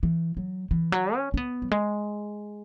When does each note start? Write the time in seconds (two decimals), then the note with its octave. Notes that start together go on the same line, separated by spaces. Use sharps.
0.03 E3
0.37 F#3
0.71 E3
0.92 F#3
1.16 C#4
1.34 C#4
1.37 B3
1.62 F#3
1.71 G#3